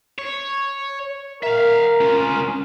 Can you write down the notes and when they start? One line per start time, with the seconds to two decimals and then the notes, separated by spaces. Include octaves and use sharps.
0.18 C#5
1.43 A#4 E5 F5
2.01 C#4 F4